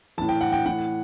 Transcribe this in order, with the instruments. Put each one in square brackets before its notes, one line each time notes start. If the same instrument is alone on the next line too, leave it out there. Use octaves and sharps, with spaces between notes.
[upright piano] A2 E3 A5
G5
F#5
G5
A2 E3 F#5